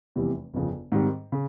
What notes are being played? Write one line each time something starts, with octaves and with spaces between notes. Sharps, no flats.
F1 E2 C3 E3 G3
G1 F2 C#3
G#2 D#3 G3 C4
C#3